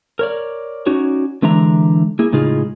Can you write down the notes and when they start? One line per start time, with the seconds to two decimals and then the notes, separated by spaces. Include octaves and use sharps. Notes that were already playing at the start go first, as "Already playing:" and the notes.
0.19 A#4 C#5 D5
0.86 C#4 D#4 F#4 C#5 D5
1.42 D3 E3 G#3 D4 E5 A#5
2.19 A#3 E4 G#4
2.33 A2 C#3 G#3 D#4 F4 G#4